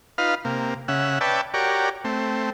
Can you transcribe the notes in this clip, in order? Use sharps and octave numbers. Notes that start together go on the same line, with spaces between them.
D#4 F4 B4 F5
C3 A#3
C#3 E5 F#5
B4 C#5 D5 E5 G5 A5
F#4 G4 A#4 C#5 D5
A3 C4